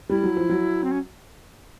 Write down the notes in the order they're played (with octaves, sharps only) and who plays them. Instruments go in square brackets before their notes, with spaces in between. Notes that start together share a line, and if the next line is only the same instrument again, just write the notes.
[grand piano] G3 [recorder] E4
[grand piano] F#3
F3
F#3
[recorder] C4
C#4